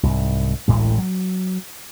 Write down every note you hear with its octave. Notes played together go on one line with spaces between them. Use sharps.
C2 G#2
A1 D2 A2 G#3
F#3